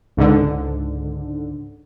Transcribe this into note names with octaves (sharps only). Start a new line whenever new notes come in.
C#2 G#2 D3